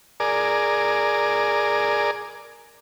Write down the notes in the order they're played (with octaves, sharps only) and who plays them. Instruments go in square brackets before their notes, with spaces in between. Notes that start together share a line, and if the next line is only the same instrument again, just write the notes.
[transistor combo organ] G#4 A#4 D5